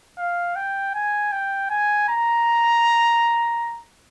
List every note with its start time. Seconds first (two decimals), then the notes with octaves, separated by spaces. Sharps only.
0.19 F5
0.56 G5
0.95 G#5
1.32 G5
1.70 G#5
2.09 A#5